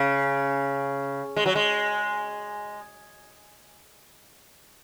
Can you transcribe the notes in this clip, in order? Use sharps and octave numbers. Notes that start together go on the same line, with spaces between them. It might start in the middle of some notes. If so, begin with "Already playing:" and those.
Already playing: C#3
G#3
F#3
G#3